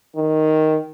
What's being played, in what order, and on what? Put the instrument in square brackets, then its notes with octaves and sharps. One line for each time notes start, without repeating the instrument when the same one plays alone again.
[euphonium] D#3